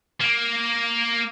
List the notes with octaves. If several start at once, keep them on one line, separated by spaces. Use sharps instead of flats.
A#3